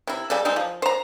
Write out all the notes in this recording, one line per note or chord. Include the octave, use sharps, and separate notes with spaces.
C3 E4
C#3 G3 A4
G3 G#3 C4 D#4
F3
C5 A#5